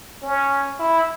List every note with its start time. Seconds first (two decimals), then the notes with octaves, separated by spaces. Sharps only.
0.22 C#4
0.79 E4